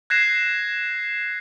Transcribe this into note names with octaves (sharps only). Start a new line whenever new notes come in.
F#6 G#6 A#6 C7 E7